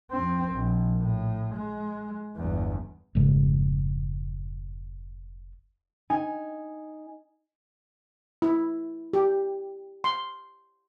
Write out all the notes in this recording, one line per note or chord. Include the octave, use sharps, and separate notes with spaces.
F2 C4
A#1
A2
G#3
G1 E2
F1 G#2 C#3 G#3
D#4 G#5
E4
G4
C6